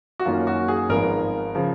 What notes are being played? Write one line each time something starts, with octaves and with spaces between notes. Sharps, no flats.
F#4
F#2 D#3 A#3 C#4 F4
F#4
G#4
G#1 G#2 F3 B3 A#4
C#3 F3